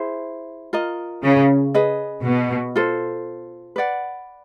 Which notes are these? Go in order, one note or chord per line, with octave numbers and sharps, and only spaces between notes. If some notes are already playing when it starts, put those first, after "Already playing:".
Already playing: E4 G#4 C5
F4 A#4 D#5
C#3
G#4 B4 D#5
B2
F4 A4 C5
B4 D5 F#5